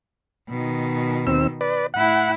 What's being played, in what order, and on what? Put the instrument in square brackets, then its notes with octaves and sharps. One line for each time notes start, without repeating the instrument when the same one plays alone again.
[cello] B2 D#3
[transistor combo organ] D#2 C4 E6
B4 D5
[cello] A2 E4 [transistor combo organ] F#5